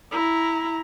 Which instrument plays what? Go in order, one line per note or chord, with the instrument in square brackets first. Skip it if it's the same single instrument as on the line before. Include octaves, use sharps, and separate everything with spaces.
[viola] E4 A#5